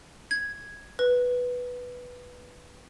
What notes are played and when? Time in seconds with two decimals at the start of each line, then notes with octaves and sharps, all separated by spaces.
0.31 G#6
0.99 B4